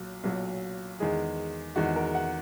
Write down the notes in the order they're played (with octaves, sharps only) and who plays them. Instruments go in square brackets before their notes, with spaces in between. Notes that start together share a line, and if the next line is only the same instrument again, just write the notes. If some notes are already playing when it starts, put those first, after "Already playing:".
Already playing: [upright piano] B1 A#2 F#3
B1 A#2 F#3
E2 D#3 G#3 G#4
E2 D#3 G#3 F#4
A#4
F#5